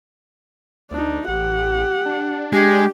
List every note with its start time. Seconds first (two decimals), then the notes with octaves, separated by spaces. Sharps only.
0.91 D2 D4 D#4
1.28 A1 G4 F#5
2.05 D4
2.53 G#3 G4